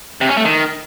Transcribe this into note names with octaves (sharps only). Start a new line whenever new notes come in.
C3
C#4
A3
D#3